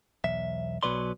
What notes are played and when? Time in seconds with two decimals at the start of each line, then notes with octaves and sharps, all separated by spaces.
0.24 B1 E2 E5
0.83 B1 B2 F#3 B4 D5 C6